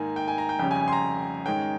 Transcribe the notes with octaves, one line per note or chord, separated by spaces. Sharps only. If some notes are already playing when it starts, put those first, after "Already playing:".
Already playing: G#2 D#3 A#3 G#5
G5
G#5
A#5
G5
F2 C#3 G3 C#4 G5
G#5
G#5
C6
A#5
G#2 D#3 G#3 C#4 G5